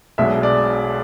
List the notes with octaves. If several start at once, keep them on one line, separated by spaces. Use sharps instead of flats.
B1 B2 G#3 D4 E5
D5